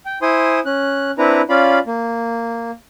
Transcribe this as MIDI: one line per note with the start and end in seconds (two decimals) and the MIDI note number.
0.06 0.19 79
0.22 0.60 64
0.22 0.60 72
0.22 0.60 80
0.22 0.60 84
0.22 0.60 87
0.65 1.11 61
0.65 1.11 90
1.18 1.41 60
1.18 1.41 62
1.18 1.41 64
1.18 1.41 71
1.18 1.41 82
1.49 1.79 61
1.49 1.79 65
1.49 1.79 74
1.49 1.79 77
1.49 1.79 83
1.87 2.71 58